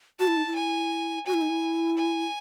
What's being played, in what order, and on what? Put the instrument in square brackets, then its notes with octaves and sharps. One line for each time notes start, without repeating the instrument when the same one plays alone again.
[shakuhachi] F#4 [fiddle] A5
[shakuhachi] E4
D#4
E4
[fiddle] G#5
[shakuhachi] F#4 [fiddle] G#5
[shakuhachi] E4
D#4
E4
[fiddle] G#5